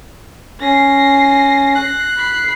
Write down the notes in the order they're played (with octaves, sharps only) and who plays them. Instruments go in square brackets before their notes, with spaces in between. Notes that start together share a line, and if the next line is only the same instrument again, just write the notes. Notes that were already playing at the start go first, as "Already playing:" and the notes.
[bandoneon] C#4 [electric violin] A#6 C7
[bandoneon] F#6
[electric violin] B5 C7